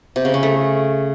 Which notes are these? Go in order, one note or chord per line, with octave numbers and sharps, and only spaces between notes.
C3
C#3
C#4
A3